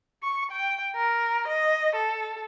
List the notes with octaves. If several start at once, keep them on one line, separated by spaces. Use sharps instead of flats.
C#6
G5
A#4
D#5
A4